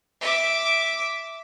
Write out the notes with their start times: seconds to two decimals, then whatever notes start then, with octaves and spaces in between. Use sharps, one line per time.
0.21 E5 D6